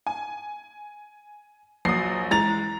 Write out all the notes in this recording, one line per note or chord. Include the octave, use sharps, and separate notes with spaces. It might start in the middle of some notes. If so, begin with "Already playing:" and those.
G#5
A#1 F#3 D#6 C7
E3 G#3 A#5 A6 F7